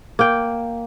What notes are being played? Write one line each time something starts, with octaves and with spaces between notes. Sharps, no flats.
A#3 G5